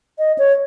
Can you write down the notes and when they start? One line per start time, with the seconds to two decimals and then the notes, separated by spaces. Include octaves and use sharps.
0.19 D#5
0.38 C#5